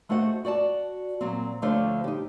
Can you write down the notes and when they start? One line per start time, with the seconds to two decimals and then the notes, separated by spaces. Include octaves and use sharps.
0.09 G#3 A3 F#4 C5 F#5
0.45 F#4 D5 G5 A5
1.21 A#2 F#3 C4
1.62 D2 D3 F3 A3 C5 C#5
2.04 D#4 G4